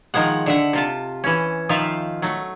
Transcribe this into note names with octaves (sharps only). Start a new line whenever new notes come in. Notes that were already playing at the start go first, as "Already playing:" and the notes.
D#3 F3 G#3 F#5
D3 E5 F#5
C3 F4 A5
E3 C#4
D#3 F3 F4 E5 F5
F#3 A3